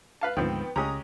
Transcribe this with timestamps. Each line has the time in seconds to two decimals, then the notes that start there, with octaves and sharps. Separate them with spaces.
0.21 B4 F5 A5
0.37 D2 G#2 D#3 F3 B3 C4 G5
0.76 C#2 G#3 C#4 G4 A#5 D#6